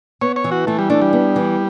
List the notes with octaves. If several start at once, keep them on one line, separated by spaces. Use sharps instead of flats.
B3 C#5
C#5
E3
F#4
E3 A3
G3
A3 D4
G3
B3
E3